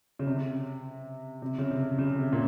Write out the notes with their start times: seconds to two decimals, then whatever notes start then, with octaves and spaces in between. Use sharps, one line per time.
0.19 C#3
0.27 C3
1.42 C3
1.58 C#3
1.71 C3
1.99 C#3
2.19 C3
2.33 A#2